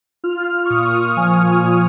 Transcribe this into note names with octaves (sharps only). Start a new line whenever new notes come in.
F4 F6
C#6
A#2 D#6
F3 G#5
A#2